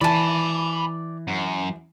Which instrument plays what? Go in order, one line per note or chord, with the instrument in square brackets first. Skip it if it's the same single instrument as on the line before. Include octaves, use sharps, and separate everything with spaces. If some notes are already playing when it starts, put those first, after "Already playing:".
[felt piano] E3 [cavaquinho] D5 A5 [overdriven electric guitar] G#5 B5
[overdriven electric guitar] F#2